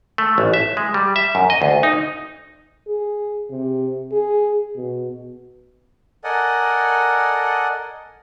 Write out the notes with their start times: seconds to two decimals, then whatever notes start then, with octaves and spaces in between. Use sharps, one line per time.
0.18 A3
0.38 A1
0.54 E5
0.77 G#3
0.94 G3
1.16 E5
1.35 F#2
1.50 D#5
1.62 D2
1.83 D#4
2.87 G#4
3.51 C3
4.12 G#4
4.76 B2
6.24 A4 A#4 D5 D#5 F#5 G#5